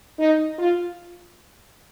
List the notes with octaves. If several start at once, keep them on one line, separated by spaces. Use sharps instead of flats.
D#4
F4